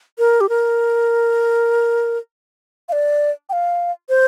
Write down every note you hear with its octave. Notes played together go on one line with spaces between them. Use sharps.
A#4
G4
A#4
F5
D5
G5
F5
C5